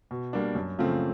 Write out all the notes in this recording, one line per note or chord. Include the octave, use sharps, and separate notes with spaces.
B2
G3 A#3 D4
F#2
C#3 F3 A3 C4